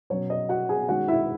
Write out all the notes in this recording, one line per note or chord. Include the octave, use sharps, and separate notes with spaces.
B2 F#3 C#4 C#5
D#5
F#4 F#5
G#4 G#5
D#3 G#3 C#4 F#4 F#5
E4 E5